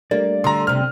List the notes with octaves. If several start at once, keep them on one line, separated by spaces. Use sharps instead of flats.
G3 A3 A#3 D4 D5
D3 A#5 C6
G2 C3 F6